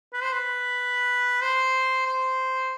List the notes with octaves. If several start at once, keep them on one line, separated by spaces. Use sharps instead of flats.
B4
C5
B4
C5
C5